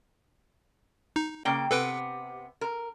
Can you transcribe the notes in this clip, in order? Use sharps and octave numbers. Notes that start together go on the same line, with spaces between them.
D#4
C#3 A#3 G5
C3 B3 A4 B4 G5
A#4